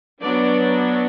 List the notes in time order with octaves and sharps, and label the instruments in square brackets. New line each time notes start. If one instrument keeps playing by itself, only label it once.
[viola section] F#3 B3 D4 D5